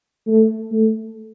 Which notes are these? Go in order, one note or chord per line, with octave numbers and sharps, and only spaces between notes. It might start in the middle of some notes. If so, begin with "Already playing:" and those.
A3
A3